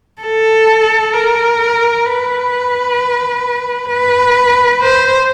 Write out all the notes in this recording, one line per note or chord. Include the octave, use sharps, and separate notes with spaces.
A4
A#4
B4
B4
C5